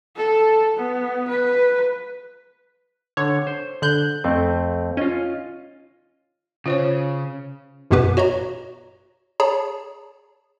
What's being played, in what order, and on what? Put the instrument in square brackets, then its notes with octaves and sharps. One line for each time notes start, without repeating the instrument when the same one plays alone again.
[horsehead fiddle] A4
B3
B4
[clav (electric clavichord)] D3 [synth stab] C#5
[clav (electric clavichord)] C5
[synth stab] D3 F#6 G6
[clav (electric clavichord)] F2 A3 C4
[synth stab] C#4 [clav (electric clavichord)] F4 D#5
[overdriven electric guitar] C#3 [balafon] F4 C5 C#5
[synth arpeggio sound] A1 F#2 B2 B3 G4 B4
F#4 C#5 D#5 A#5
G#4 C#5 A5 A#5